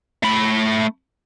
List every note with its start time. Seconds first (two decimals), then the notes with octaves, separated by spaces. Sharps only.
0.23 A3 B5